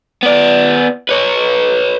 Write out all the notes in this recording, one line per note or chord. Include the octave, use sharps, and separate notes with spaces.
B3 D5
B4 C#5